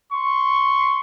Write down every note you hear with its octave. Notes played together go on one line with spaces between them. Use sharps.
C6 C#6